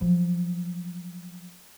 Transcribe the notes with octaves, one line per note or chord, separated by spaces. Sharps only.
F3 F#3